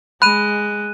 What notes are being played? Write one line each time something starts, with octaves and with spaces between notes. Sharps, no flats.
G#3 B5 F#6 D#7